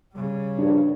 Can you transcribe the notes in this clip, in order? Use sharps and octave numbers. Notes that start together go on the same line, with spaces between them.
C#3 G3
A#1 G2 D4